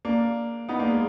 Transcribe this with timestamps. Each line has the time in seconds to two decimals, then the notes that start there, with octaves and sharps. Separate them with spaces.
0.05 A#3 D4
0.69 B3 D#4
0.79 A#3 D4
0.90 G#3